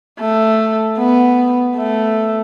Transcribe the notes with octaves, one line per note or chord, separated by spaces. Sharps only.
A3
B3
A3